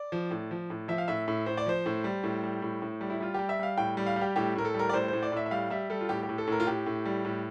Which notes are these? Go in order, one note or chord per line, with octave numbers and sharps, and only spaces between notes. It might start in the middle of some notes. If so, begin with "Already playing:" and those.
Already playing: D5
F3
A2
F3
A2
F3 E5
F5
A2 E5
A2
A2 C5
D5
F3 C5
A2
G3
A2
G3
A2
A2
G3
E4
G3 F4
G3 G4
E5
G3 F5
A2 G5
G3
F5
G3
G4
A2 G4
A2 A#4
A4
G3
A#4
D5
A2 C5
A2 C5
D5
A2 E5
E5
G3 F5
G3 E5
G3 A4
F4
A2 G4
G4
A2
A4
A2 A#4
F4
A2 G4
A2
G3
A2